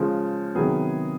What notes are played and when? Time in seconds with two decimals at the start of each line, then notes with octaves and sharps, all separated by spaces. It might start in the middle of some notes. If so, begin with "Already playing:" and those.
Already playing: C#3 F3 G#3
0.55 C3 D#3 F#3 B3 G#4